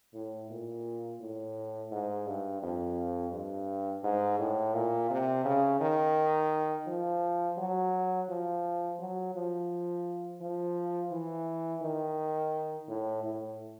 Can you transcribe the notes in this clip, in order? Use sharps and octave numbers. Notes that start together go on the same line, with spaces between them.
A2
A#2
A2
G#2
G2
F2
G2
G#2
A2
A#2
C3
C#3
D#3
F3
F#3
F3
F#3
F3
F3
E3
D#3
A2
A2